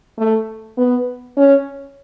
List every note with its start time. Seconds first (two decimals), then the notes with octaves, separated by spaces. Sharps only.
0.18 A3
0.78 B3
1.37 C#4